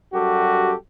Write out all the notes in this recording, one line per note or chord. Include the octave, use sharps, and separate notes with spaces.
F#2 G3 F#4 G4 A4